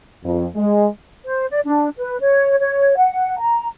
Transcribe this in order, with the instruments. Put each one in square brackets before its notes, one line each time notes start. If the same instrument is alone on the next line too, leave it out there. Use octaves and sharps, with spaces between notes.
[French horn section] F2
G#3
[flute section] C5
D5
D4
B4
C#5
C#5
F#5
A#5